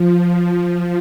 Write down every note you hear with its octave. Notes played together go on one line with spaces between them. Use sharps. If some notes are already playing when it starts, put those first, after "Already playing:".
Already playing: F3